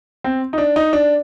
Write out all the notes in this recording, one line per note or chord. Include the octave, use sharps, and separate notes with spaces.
C4
D#4
D4
D#4
D4